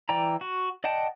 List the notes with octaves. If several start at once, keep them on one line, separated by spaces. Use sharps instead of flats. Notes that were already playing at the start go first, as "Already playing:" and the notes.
E3 D5 G5 A#5
F#4
D5 D#5 F#5 G5 A5